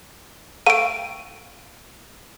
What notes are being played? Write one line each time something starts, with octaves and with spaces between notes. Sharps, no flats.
A3 F5 G5 D7 D#7